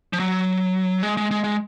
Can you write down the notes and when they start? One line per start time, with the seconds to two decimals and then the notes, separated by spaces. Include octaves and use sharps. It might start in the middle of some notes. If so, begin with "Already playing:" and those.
0.13 F3
0.19 F#3
1.03 G#3
1.17 G#3
1.31 G#3
1.44 G#3